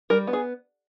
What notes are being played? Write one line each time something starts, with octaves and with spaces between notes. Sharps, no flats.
G3 A#4
B3
G#4